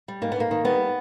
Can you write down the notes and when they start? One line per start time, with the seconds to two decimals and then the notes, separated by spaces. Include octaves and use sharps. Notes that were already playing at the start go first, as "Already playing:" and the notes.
0.08 G3
0.22 G#2 A#3
0.32 B3
0.36 G#2 A#3
0.51 D#3
0.65 G3 B3